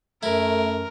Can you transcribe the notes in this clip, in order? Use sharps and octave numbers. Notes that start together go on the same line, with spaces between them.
F#2 A3 E4 A#4